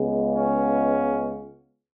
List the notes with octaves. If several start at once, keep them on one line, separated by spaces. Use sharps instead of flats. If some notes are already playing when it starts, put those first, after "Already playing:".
Already playing: C#2 C#3 G#3 B3
C#4